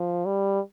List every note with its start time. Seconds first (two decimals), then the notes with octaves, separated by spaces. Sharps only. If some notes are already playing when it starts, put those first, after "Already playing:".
Already playing: F3
0.26 G3